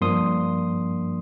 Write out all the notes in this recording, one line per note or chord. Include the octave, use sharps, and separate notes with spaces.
G2 F3 A#3 D4 C6 D#6